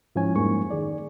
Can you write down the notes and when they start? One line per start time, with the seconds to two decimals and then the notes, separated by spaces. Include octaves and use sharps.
0.15 G#2 F3 C#4 E4 C#5 G#5
0.36 F2 G#2 G3 A#3 C#6
0.71 D#3 G#4 D5